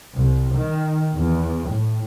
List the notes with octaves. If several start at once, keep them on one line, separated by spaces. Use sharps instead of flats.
C2
D#3
E2
A2